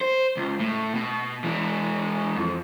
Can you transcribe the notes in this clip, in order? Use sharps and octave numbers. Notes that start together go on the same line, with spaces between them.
C5
C#2
A2
B2
E3 G#3
F2